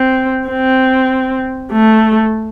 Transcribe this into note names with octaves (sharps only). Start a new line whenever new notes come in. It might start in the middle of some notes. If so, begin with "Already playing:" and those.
Already playing: C4
C4
A3